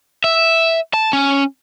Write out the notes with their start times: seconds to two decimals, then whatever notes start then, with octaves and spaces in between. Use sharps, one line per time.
0.24 E5
0.94 A5
1.13 C#4